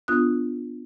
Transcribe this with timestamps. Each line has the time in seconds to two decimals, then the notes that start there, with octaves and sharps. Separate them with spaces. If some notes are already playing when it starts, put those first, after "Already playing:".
0.08 B3 D4 F4 D#6 F#6